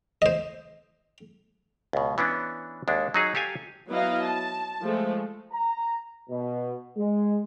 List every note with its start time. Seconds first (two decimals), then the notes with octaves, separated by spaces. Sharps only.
0.22 C5 D#5
1.93 C#2 B2
2.18 E3 B3 C#4 D4
2.88 D#2 G#3 D4
3.14 F#3 D#4 G#4
3.35 G4 A4 F5 G#5
3.90 F#3 B3 E4 D#5 F5
4.24 A5
4.80 F3 G#3 A3
5.52 A#5
6.30 B2
6.97 G#3